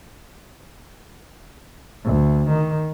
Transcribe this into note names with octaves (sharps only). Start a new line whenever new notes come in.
D2
D#3